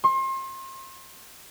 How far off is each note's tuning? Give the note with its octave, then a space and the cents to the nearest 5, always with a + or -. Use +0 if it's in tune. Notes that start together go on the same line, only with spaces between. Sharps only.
C6 +35